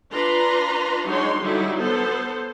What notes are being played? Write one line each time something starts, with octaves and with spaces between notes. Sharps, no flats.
D4 F4 B4 A#5 C6
F#3 G#3 D4 D#4 C#5 C6
D3 F#3 G3 D#4 E4
B3 A4 C5